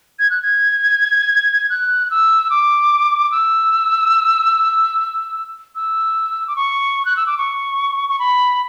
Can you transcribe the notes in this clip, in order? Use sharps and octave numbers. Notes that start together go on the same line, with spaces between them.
G#6
F#6
G#6
F#6
E6
D6
E6
E6
D6
C#6
F#6
E6
D6
C#6
C#6
B5